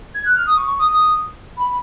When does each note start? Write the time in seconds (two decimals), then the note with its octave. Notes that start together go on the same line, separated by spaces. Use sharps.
0.14 G#6
0.25 F#6
0.35 F6
0.46 D#6
0.56 C#6
0.68 C#6
0.79 D#6
0.91 D#6
1.57 B5